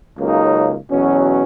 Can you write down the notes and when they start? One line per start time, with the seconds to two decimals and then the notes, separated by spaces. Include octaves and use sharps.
0.19 C#2 C#3 F#3 A#3 D#4
0.90 E2 B2 F#3 C#4